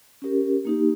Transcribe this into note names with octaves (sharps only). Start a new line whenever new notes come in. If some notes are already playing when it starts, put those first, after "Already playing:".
C#4 G4 A#4
A#3 D#4 G4